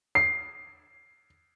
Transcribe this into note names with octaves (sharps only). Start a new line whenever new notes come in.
C7